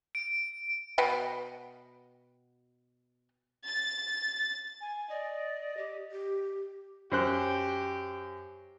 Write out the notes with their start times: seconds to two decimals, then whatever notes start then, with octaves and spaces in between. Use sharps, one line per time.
0.15 D7
0.98 B2 B4 F#5 G5
3.67 A6
4.81 G#5
5.10 D5 D#5
5.77 G4
6.12 G4
7.12 F#2 G4 C5 F#6